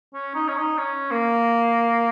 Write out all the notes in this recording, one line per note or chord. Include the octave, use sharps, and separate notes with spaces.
C#4
D#4
C#4
D#4
C#4
A#3